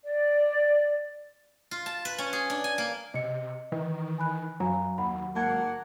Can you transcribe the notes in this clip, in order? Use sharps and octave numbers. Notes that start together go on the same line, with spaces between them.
D5
F4
A5
B4
C#4
G#4
D4
G#5
A#3
C3 D#5 C#7
D#3 E3
G#5 B5 F#6
F#2 F#3 F5 G#5 A#5
D#2 F#5 B5
G#1 A#3 F#5 A5 G#6